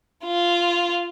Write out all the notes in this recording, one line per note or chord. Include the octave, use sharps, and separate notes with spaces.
F4